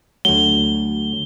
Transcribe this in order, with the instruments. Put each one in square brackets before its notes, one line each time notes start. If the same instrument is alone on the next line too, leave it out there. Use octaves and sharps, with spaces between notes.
[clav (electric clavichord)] D2 F#3 [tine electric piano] D3 A3 [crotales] G7